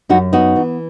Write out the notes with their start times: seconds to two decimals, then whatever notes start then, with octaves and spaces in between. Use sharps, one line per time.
0.09 F#2 D#4 F#4
0.32 B3 D#4 F#4
0.56 E3